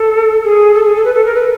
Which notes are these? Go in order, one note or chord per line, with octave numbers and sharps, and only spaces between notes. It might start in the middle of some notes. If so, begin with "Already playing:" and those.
Already playing: A4
G#4
A4
G#4
A4
B4
A4
A#4
B4